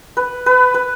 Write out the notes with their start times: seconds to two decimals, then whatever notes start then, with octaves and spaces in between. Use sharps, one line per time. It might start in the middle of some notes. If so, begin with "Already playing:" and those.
0.17 B4
0.46 B4
0.74 B4